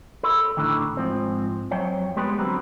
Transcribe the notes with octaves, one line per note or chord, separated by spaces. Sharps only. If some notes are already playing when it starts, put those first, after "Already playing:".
A4 B5
A2 D3 D#3
G#2 F3 C4
F2 F#3 C5 C#5 G5
G3 G#3 B3 G4 B4
D3 F#3 C4 F#4 B4